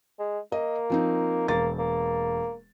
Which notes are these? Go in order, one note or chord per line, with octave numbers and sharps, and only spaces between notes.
G#3
A#3 D#5
F3 C4 D#4
E1 A#3 A6
A#3